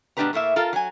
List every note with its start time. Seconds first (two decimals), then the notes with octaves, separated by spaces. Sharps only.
0.17 B2 G#3 D4 G4 B4 A#5
0.33 A2 A3 A#3 E5
0.56 F4 A4 A#4 F5
0.73 F#3 G#5